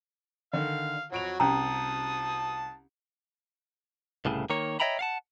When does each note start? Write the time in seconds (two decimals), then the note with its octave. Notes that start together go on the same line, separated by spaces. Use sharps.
0.53 D3 D#3 F5
1.12 F2 F#3 F#4 D7 F7
1.40 C2 C#4 A5 A#5 D#6
4.25 C2 A2 C#3
4.50 D#3 A#3 C#5
4.80 C#5 D#5 E5 G5 A#5 B5
4.99 F5 F#5 A5